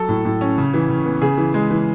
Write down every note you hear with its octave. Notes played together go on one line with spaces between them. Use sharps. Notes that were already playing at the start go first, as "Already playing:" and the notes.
Already playing: F#3 A4
A2
A2
C#4
C#3
E3
C#3
B3
C#3 G#4
E3
G#3
E3